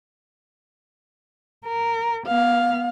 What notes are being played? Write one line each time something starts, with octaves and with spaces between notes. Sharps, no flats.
A#4
B3 F5